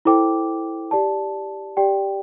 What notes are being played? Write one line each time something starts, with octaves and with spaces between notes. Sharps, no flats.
E4 A4 C5 G5 D6
G4 D5 A5
G4 D5 G5